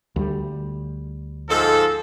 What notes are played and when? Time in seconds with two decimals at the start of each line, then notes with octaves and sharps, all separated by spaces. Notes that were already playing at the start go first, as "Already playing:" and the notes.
0.16 D2 G3
1.49 G#2 F3 A4